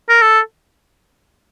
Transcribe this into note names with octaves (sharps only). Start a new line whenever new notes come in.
A#4
A4